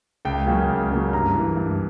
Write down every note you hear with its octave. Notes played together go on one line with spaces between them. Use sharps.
C#2 G5
C#3 F#3 A#3 C#4
C#2
C#3 F#3 A#3 C#4
G2 A#5
E3 A#3
G2